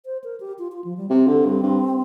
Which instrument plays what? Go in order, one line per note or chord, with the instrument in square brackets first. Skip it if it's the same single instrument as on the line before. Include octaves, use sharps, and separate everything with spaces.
[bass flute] C5
A#4
G4
F4
F4
F3
G3
[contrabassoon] C3 [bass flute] C4
[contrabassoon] D3
G2
G2